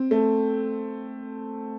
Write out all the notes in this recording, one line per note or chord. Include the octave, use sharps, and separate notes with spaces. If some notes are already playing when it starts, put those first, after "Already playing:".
Already playing: C4
A3